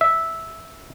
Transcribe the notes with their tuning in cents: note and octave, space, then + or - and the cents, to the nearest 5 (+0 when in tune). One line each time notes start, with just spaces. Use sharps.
E5 -5